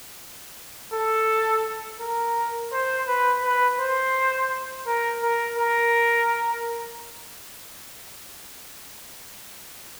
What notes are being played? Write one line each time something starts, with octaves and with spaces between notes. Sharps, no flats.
A4
A#4
C5
B4
B4
C5
A#4
A#4
A#4